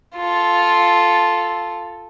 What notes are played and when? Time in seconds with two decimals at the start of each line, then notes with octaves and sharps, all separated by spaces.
0.16 F4 A4